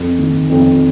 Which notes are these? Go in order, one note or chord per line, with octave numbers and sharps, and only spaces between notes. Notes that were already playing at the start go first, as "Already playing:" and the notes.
Already playing: F2
D#3
F2